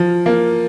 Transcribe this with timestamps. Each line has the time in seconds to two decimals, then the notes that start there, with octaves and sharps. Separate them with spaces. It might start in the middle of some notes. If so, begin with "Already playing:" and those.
Already playing: F3
0.26 A#3